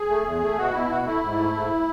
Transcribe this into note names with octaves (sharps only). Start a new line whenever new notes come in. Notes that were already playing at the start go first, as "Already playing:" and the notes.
Already playing: G#4
A3
E2
A3
B2 F#4
B2 E4
B2 F#4
A3 E4
G#2
A3
G#2